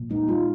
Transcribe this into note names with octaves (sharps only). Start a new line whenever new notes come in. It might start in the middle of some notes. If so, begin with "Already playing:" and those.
Already playing: A#2
G#3 D#4
G#3 F4